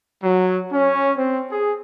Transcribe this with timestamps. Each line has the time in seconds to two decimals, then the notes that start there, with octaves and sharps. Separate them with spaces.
0.23 F#3
0.72 C#4
1.18 C4
1.51 G#4